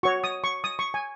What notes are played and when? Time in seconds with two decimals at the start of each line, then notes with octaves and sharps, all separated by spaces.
0.03 F#4 C#5 C#6
0.24 D#6
0.44 C#6
0.64 D#6
0.79 C#6
0.94 G#5